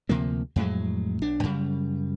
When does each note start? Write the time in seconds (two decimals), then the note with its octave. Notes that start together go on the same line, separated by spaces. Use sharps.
0.09 D2 C3 F3 A#3
0.56 F2 A2 F#3 G#3
1.22 B1 D4
1.43 F#2 C#3 G3